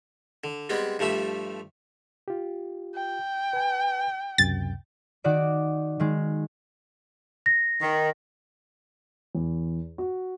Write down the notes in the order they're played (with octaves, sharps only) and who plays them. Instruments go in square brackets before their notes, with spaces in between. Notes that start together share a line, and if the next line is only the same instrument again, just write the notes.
[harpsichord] D3
G3 G#3 B3 C4
G2 F3 G3 A3 E5
[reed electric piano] F4 G4
[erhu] G5
[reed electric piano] B4 G#5
[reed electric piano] C#2 F#2 C3 [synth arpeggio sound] A6
[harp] D#3 F#4 D5 D6
D#3 G#3
[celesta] A#6
[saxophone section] D#3
[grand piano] E2
F#4